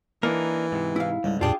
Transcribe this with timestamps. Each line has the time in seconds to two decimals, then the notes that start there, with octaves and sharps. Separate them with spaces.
0.23 E3 A#3 D4 D#4 A#4
0.72 G#2 C3
0.96 E4 F5
1.24 C#2 G#2 D3 G3
1.41 F2 A#2 D4 F4 G4 G#4